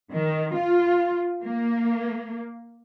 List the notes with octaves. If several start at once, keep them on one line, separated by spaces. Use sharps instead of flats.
D#3
F4
A#3